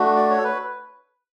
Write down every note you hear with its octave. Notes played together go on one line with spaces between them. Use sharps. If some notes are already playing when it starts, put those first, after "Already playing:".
Already playing: A3 D4 F#4
D5
C#5
A4
B4